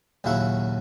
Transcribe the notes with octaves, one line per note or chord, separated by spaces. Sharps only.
A#1 D#2 C#3 F#3 E4 F#5